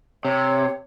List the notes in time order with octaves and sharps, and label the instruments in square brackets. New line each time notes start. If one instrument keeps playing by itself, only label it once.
[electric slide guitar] C3 [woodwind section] C#5